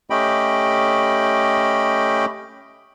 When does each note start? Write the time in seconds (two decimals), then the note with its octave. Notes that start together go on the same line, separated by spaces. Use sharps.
0.10 A3 C#4 G4 D#5 G5 B5